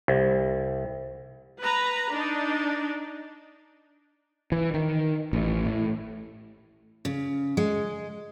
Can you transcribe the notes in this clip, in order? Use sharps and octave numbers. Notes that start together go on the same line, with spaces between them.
C2
B4 A#5
D4 D#4
E3
D#3
A1
A2
C#3
G#3